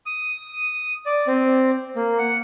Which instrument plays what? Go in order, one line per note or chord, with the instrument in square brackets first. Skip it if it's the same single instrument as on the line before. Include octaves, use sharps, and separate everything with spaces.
[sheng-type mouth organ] D#6
D5
C4
A#3
F#5